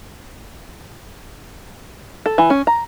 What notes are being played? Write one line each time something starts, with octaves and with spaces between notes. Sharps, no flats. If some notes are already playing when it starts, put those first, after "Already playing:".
A4
E3
C#4
A#5